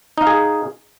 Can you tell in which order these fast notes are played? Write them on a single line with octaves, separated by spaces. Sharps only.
D#4 F5 G#4